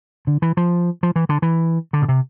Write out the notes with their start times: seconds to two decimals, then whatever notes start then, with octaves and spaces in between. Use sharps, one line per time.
0.27 D3
0.42 E3
0.57 F3
1.03 F3
1.16 E3
1.29 D3
1.42 E3
1.93 D3
2.02 B2
2.08 C3